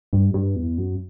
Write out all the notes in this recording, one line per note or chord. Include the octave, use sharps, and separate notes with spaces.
G2
G2
E2
F#2